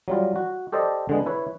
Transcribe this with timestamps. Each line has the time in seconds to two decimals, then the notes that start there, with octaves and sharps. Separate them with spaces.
0.08 F#3 G3 F4
0.36 F#4
0.72 G4 A4 C5 D5 D#5
1.09 D3 G#3 B3
1.26 E4 B4 C#5